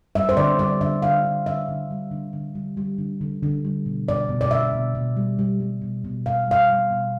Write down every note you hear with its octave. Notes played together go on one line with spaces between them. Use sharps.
G3 E5
C5
D3 D5
G3 D5
D3 E5
D3 F5
D3
D3 E5
D3
G3
D3
D3
G3
G3
D3
D3
D3
G3
B2
B2 D5
B2
D5
B2 E5
B2
B2
G3
G3
G3
B2
B2
B2 F5
G3 F5
G3
B2